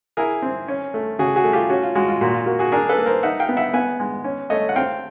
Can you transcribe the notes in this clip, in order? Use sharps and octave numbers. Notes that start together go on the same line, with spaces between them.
E4 G#4 A#4
C4
C#4
A3
C#3 F#4 G#4
F#4 G#4
A3
F4 G4
C#4 F#4
F4
G#3 F#4
F4
A#2 F#4
F4
A#3 F#4
F#4 G#4
D4 G#4 A#4
A4 B4
A#3
A#4 C5
D#4 E5 F#5
F5 G5
B3
E5 F#5
B3 F#5 G#5
G#3
C#4
A3 C#5 D#5
F#5
C4 F5 G5